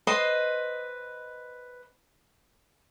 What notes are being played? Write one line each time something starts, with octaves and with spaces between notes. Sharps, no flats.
B4 C5 D#5 C6